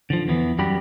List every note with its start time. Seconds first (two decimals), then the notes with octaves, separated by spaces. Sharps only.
0.10 D3 F3
0.28 E2 E3 B3
0.59 F#2 G3 F#4 G4 B5